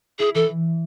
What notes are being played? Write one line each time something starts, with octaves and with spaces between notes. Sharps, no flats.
E4 G#4
E3 A4